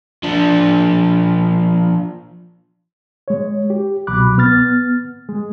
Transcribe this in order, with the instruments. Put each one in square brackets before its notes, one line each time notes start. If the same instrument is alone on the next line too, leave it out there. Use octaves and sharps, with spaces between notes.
[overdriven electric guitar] F3 D4
[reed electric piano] G#3 C#5
G4
C2 B2 F#3 B5 D6 F#6
B3 F6 A6
G#3 G#4